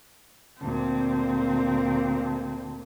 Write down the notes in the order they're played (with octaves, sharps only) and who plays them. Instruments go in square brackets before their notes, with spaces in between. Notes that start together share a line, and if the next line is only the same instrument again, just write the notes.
[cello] D2 A#2 [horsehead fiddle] C4